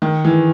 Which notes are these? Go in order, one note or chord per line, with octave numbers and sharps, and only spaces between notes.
D#3
E3